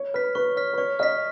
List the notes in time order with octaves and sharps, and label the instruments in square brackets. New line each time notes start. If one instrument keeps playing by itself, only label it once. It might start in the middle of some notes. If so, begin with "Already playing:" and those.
Already playing: [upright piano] C#5
[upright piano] B4 [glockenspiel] F6 B6
[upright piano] B4 [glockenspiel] C#6
[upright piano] C#5 [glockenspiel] F6 B6
[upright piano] B4
[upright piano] C#5 [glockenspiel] C#6
[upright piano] D#5 [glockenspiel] F6 B6